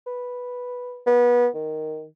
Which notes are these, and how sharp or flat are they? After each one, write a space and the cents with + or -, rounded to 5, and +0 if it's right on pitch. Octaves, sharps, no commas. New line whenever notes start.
B4 -5
B3 -25
D#3 +0